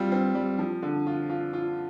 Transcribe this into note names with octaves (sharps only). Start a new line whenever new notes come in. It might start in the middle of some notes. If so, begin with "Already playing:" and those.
Already playing: G3 C4 F4
C4
G3
F3
D3
F4
F4
F4